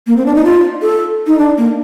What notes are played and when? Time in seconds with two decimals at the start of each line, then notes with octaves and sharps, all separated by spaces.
0.07 A#3
0.17 C4
0.26 D4
0.35 D#4
0.45 F4
0.82 A4
1.27 D#4
1.39 D4
1.58 A#3